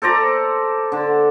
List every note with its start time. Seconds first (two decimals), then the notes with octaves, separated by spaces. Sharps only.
0.02 A4 C5 D5 A#5
0.92 D3